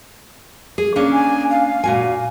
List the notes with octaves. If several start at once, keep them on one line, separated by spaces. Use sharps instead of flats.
G#4
A#3 C#4 D4
G#5
F5
A#2 F#4 G#5